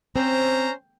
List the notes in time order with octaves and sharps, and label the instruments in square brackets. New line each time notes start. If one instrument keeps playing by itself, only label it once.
[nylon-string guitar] C4 [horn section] C#4 C5 A#5